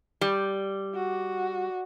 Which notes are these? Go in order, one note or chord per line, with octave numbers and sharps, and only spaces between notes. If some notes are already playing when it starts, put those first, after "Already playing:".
G3
F#4